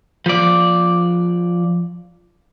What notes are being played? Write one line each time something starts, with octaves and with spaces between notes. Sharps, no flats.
F3 D5